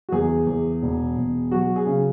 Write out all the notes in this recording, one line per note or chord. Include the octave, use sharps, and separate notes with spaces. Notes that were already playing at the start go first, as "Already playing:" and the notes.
F#4
E2 G#4
E2
E1
E1
F#3 F#4
G#4
C#3